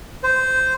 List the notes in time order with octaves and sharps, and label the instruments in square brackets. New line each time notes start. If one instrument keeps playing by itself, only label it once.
[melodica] C5